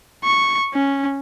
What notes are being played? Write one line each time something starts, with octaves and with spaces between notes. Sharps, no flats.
C#6
C#4